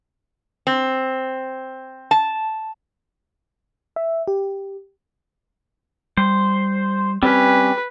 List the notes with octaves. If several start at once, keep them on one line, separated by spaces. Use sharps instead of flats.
C4
A5
E5
G4
G3 C5
G3 C4 C#4 B4